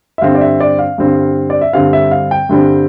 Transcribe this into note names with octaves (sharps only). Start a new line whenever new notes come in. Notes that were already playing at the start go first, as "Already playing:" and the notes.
E5
G2 D3 G3 C4 F5
D5
E5
D5
F5
G2 D3 G3 C4
D5
E5
G2 D3 G3 C4 F5
E5
F5
G5
G2 D3 G3 C4